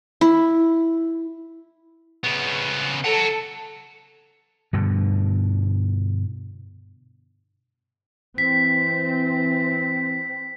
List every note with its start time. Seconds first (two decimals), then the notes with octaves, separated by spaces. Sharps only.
0.21 E4
2.24 C#3 B3
3.05 A4 F#5 A#5
4.73 G2 B2 D3
8.38 E3 C4 B6